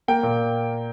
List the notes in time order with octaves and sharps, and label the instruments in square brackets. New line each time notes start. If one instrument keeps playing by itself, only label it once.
[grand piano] A#3 G5
A#2